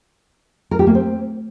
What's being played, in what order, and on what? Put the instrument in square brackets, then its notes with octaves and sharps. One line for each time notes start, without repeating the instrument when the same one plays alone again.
[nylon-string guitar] A#4
G4
A#3
C4